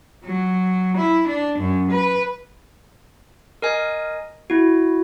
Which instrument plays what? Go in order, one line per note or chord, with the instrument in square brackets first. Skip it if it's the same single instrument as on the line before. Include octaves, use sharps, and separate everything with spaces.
[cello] F#3
E4
D4
F#2
B4
[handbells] A#4 D#5 G#5
E4 F#4